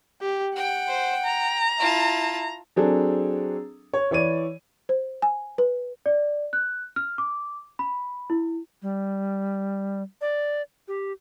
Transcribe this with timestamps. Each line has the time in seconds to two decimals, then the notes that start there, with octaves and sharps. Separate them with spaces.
0.22 G4
0.56 F#5 G5
0.89 C5
1.25 A#5
1.79 E4 F4 A5
2.76 F#3 C4 D4 G#4 A4
3.93 C#5
4.11 E3 C#5 D5 D#7
4.89 C5
5.22 G#5
5.58 B4
6.06 D5
6.53 F#6
6.96 F6
7.18 D6
7.79 B5
8.30 E4
8.82 G3
10.21 D5
10.88 G4